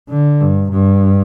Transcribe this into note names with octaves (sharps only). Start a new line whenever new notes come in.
D3
G2
G2